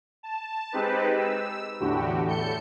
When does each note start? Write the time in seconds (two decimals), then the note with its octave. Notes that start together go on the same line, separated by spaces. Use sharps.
0.23 A5
0.72 G#3 C4 D#4 G4 B4
1.16 E6
1.80 E2 A2 D3 F#4 G4
2.27 A2 A4 G6 C#7